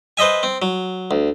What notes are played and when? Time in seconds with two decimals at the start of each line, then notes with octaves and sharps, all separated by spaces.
0.17 B4 C5 D#5 E5 G#5
0.43 C4
0.62 F#3
1.11 D2